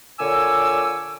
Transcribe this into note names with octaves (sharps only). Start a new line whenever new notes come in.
A#2 D3 C#5 G#5 D6 E6